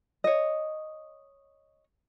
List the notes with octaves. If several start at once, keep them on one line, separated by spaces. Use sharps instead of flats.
C#5 D#5